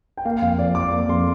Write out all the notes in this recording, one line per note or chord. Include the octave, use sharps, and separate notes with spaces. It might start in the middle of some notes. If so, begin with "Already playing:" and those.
G5
A#3 F5
F2 F5
F3 D5
F2 D6
A#3
F2 C6